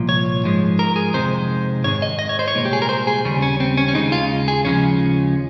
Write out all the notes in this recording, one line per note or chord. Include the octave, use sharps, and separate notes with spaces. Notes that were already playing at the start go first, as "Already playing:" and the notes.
Already playing: C2 A#2 F3
C#5
G#2 F3 G#3
A#4
G#4
F2 C3 D#3 G#3 C5
G#2 D#3 G#3 C#5
D#5
D#5
C#5
C5
C#5
C2 A#2 G#3
G4
G#4
A#4
C5
G#4
D#2 C#3 G3 C#4
C#4
C4
C#4
C#4
D#2 C#3 G#3 D#4
F4
G#4
D#2 C#3 F3 G#3 C#4